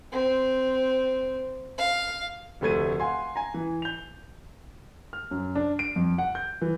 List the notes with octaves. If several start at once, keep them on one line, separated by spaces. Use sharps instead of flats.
C4
F5
F1 D2 A3 G#6 D#7
F5 F#5 G#5 C6
G#5 A#5
E3
G6 F7
F6
F#2
D4
D7
F2
F#5
G6
E3